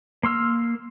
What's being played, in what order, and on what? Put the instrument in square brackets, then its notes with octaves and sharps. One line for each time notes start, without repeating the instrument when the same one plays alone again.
[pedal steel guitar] A#3 C6 E6 F6